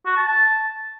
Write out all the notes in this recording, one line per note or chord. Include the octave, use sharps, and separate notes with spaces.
F#4
A5
A5